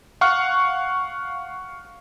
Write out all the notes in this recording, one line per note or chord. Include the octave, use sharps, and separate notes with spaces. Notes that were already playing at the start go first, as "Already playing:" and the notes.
F5 F#5 C#6 F6